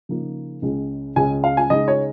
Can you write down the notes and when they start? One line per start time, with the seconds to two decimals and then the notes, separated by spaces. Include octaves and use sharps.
0.09 C#3 F3 A#3 D#4
0.62 C#2 C#3 G#3 C#4
1.16 C#2 C#3 G#3 C#4 G#5
1.44 F5
1.57 G#5
1.70 C#3 G#3 D#4 D#5
1.88 C#5